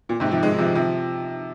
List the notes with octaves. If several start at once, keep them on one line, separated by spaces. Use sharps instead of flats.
A#2
G#2 C3
C3 F3
D#3 G#3
C3 F3
C3 F3